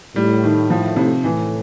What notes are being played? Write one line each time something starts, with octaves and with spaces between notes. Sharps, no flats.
A2 G3
D#3
F3
C3
A2 E3